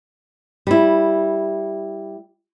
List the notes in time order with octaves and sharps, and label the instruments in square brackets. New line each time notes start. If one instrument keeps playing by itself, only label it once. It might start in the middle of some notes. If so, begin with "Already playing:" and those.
[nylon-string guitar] G3 E4